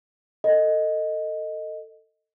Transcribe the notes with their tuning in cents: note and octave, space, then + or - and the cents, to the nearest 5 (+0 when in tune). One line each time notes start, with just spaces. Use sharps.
A4 +25 D#5 +0